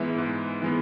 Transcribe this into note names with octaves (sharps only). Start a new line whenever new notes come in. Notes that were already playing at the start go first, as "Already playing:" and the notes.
Already playing: G#2 E3 G#3 B3 E5
G#2
E3 G#3 B3